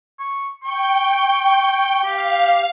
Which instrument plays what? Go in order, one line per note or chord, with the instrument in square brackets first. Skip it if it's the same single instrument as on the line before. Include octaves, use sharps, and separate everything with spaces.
[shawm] C#6
[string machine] G5 [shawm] C#6
[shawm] G4 [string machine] F5